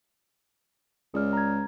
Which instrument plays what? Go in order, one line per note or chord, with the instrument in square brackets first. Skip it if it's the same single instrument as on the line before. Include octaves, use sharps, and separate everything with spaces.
[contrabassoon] C#2 [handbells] G#4 D5 F6
[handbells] A#5 G#6